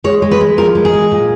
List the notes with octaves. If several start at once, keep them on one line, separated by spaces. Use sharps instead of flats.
G#3 C#5
G#3
B4
G#3
F3 A#4
G#3
G#4
G#3
A#2